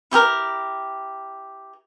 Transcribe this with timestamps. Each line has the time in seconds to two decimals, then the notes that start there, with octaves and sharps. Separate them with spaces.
0.11 E4 G4 A4 A#4